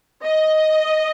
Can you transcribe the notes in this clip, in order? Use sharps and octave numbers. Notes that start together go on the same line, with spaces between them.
D#5